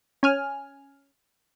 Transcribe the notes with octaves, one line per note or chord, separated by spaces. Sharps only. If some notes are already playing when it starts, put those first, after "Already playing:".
C#4 G#5 F6